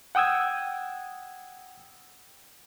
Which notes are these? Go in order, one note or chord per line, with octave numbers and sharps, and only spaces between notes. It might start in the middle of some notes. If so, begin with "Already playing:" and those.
F#5 G5 D#6 E6 G#6